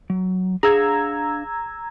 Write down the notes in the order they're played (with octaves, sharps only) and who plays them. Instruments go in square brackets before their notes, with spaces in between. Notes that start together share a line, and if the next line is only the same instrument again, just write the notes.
[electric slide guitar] F#3
[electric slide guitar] D4 F5 F#5 [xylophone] G#4 [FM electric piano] A#5 E6 G#6